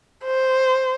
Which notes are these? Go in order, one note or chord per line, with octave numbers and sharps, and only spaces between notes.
C5